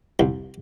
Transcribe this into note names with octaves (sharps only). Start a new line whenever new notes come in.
C2